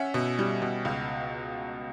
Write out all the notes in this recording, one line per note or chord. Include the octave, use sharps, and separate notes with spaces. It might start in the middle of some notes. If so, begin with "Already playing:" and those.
Already playing: C#4 E5 F#5
B2
G3
B2
C#2